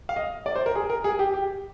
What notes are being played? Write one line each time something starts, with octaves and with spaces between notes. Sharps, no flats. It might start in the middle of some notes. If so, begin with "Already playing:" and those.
F5
D#5
D5
C5
A#4
G#4
A#4
G#4
G4
G4